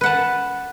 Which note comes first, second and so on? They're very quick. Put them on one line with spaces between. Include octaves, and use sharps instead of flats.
B4 F#5 A5